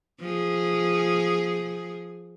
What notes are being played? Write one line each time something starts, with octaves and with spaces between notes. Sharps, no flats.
F3 G#4